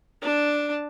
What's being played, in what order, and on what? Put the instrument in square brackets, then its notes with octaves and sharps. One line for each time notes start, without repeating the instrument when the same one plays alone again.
[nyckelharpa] D4 A5